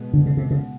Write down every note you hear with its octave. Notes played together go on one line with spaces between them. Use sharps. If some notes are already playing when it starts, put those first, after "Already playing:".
Already playing: B2 G#3 B3
D3
C#3
C3
C#3